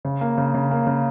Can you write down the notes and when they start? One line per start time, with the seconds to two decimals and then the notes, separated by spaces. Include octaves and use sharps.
0.05 C#3
0.21 A#3
0.38 C#3
0.54 C#3
0.71 A#3
0.87 C#3